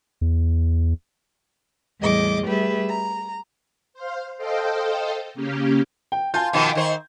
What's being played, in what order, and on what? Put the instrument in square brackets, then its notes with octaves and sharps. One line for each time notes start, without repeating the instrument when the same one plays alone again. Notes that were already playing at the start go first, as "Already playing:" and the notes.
[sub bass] E2
[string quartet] E2 A2 G3 G#4 D#5 D6
G3 A3 G4 G#4 B4 E5
A#5
[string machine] C5 F5
A4 C5 D#5 F5 G5
C#3 A#3 C#4 G4
[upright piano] G5
[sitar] F4 [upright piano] G#5 A5 G6
[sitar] B2 D#3 F3 [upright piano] G5 G#5
[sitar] D#3 C5